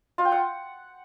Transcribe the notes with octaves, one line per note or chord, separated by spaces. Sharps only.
F4
G5
F#5